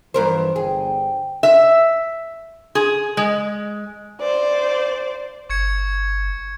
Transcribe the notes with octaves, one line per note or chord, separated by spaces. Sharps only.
G2 E3 F3 A#4 C5
G1 G#4 G5
E5
G#4
G#3
C5 D5
G1 C#6 G#6 C#7